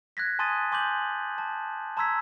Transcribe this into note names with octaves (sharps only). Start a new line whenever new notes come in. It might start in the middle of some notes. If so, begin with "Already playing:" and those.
F#6 G#6 A#6 B6
G#5 A5 C6 D#6 A6 D#7
G#5 C6 D6 G6 F#7
A5
A5 A#5 C6 E6 G#6 B6